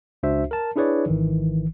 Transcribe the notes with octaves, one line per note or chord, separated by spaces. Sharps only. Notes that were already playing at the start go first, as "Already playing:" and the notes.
C#2 D4 F#4 C5 E5
A#4 A5
D4 E4 G#4 B4 C#5 D5
G#1 D#3 E3